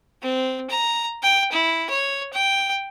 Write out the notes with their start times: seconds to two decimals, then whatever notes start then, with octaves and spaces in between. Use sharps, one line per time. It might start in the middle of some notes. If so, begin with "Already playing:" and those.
0.22 C4
0.70 A#5
1.23 G5
1.52 E4
1.89 C#5
2.33 G5